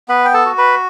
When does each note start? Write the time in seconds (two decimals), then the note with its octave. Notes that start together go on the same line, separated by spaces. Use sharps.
0.08 B3 B4 B5
0.25 G5
0.34 A4 A5
0.46 F#4
0.58 B4 B5